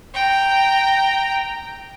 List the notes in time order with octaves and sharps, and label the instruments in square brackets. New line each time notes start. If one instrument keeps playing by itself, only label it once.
[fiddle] G5 A#5